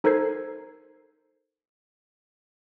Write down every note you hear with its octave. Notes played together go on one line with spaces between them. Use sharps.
D#4 A4 A#4 C5 G#6 C7